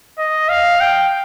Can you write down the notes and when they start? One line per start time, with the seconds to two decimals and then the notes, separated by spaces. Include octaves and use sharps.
0.18 D#5
0.49 F5
0.81 G5